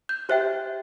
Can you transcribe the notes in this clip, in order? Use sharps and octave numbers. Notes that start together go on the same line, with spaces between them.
G6
G4 C5 E5 G5 F#6